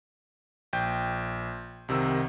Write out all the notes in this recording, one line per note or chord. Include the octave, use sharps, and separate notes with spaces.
A#1 G5 G6
C2 C3 D#3 E6